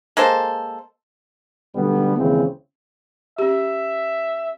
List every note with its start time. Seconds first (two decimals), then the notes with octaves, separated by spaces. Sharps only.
0.17 G#3 A#3 A4 C5
1.76 B1 D3 G3 A3 B3
2.17 D#2 C#3 E3 G#3 C4
3.38 C#4 G4 E5